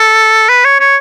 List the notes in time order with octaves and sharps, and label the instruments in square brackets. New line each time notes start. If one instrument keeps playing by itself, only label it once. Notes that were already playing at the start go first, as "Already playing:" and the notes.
Already playing: [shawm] A4
B4
C#5
C#5